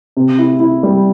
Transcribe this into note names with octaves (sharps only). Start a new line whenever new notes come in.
C3
E4
E4
G3